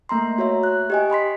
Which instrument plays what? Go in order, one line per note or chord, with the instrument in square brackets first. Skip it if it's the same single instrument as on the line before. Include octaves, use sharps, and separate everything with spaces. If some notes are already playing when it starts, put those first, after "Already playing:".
[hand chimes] A3 A#3 A#5 C6
F#4 C#5 E5
F#6
G4 D#5 G#5
D#5 B5 C6 B6